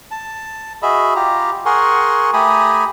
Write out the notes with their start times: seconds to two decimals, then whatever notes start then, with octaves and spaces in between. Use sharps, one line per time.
0.11 A5
0.82 F#4 G#4 D#5 E5 B5
1.15 F4 G4 A#5
1.66 G#4 A#4 F#5 G#5 C6 C#6
2.33 A3 G4 G#5 A#5 B5 D#6